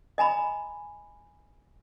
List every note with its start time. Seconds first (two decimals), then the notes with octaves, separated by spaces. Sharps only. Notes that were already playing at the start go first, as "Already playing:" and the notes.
0.18 D#5 G#5 A#5 B5